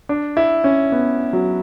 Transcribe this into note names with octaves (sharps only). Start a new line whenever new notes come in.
D4
E4
C#4
B3
F#3